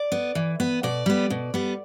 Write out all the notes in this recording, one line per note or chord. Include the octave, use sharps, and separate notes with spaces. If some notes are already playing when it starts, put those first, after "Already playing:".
Already playing: D5
B3
E3
B3
B2 D5
G3 B3
B2
G3 B3